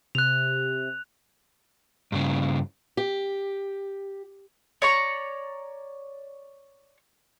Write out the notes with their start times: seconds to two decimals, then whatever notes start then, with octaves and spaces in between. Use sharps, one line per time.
0.15 C3 F#6 F7
2.12 G2 C#3
2.97 G4
4.82 C#5 D5 A#5 C#6